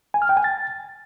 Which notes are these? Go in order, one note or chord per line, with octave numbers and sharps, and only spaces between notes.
G#5
F6
G5
G#5
A6